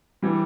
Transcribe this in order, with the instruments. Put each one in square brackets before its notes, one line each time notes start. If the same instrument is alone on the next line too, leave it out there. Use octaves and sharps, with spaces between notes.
[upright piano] E3 G3